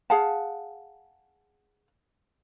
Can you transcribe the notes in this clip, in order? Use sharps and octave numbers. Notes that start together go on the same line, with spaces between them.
G#4 F5 F#5 A5